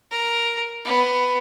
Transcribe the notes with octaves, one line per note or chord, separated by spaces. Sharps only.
A#4
B3